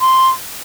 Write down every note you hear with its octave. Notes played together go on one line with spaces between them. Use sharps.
C6